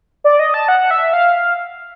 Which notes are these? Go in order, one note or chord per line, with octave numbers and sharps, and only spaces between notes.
D5
D#5
A5
F#5
E5
F5